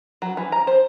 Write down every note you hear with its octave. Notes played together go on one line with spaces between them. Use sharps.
F#3
E3
A#5
C5